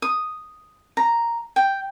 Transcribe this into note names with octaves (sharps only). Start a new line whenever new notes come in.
D#6
A#5
G5